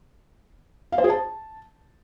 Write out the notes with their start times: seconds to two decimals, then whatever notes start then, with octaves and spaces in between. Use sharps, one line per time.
0.92 F5
0.98 C5
1.04 G#4
1.10 A5